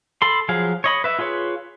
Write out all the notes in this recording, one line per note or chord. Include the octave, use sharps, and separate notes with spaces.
A4 B5 C6
F3 F#3 G#4 F5
C#5 D#5 B5
B4 E5
F4 G#4 B4 C#5